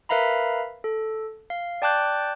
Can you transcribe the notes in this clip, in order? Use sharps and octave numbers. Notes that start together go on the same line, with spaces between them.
A#4 B4 E5 F5 A#5 B5
A4
F5
D5 G5 A5 D6 F#6 G6